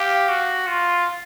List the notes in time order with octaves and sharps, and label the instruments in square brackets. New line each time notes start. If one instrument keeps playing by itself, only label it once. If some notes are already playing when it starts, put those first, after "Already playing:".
Already playing: [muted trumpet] G4 [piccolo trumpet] F5
[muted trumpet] F#4
F4